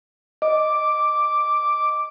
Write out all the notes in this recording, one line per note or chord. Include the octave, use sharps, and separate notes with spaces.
D#5 D6